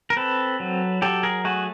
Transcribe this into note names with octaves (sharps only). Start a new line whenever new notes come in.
A#4
C4 A4 B4
F#3
F#3 G4 A4
G#4 A#4
A3 F#4 G#4